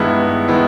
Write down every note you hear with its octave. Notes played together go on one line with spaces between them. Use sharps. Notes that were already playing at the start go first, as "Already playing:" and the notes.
Already playing: G2 D#3 G#3 B3 E4
D#3 G#3 B3 E4